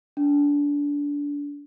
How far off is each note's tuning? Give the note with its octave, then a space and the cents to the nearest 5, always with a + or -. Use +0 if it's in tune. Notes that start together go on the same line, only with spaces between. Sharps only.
D4 -25